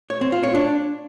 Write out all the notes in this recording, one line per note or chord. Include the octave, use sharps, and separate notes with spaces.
C#5
C4
F4
C#5
D4